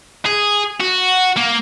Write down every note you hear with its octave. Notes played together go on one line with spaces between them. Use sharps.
G#4
F#4
A#3